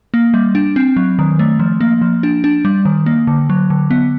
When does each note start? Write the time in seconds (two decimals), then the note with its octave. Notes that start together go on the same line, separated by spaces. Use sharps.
0.14 A#3
0.34 G3
0.55 D4
0.76 C4
0.96 F#3
1.19 D#3
1.39 A3
1.59 F3
1.81 A#3
2.01 F3
2.23 D4
2.44 D4
2.65 G3
2.85 D#3
3.06 A#3
3.27 D3
3.50 F#3
3.70 D3
3.90 B3